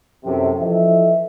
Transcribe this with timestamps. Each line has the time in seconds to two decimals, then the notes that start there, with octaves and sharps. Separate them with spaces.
0.25 F#2 A2 C3
0.59 E3 F3 A4 D#5 E5